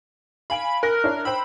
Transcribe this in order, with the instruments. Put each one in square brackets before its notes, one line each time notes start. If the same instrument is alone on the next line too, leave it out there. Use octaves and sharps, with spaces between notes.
[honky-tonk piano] F5 G#5 D7 [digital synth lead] B5
[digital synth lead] A#4 [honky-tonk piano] F#6 A#6
[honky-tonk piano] D4 E4 C#5
[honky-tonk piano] C5 G5 E6 [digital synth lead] B5